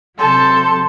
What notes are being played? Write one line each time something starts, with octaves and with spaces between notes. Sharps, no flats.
C3 F#3 A4 A5 C6 G6